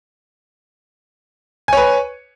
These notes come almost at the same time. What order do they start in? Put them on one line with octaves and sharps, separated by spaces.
G#5 C#5 B4